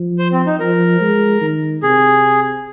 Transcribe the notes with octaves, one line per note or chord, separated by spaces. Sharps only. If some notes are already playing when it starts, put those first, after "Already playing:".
Already playing: F3
C5
C4
D#4
F3 A#4
G#3
D#3
C3 G#4